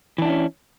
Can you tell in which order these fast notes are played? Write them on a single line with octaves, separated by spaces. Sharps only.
E3 D4 E4 C#4